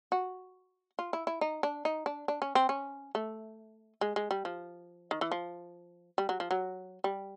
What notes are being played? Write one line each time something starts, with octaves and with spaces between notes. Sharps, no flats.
F#4
F4
E4
E4
D#4
D4
D#4
D4
D4
C#4
C4
C#4
A3
G#3
G#3
G3
F3
D#3
E3
F3
G3
F#3
F3
F#3
G3